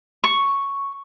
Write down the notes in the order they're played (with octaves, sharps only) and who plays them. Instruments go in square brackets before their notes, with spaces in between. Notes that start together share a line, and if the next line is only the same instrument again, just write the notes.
[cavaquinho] C#6